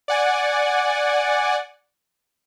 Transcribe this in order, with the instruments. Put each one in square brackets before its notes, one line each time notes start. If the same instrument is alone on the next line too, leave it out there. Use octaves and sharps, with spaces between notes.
[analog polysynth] D5 F#5 G#5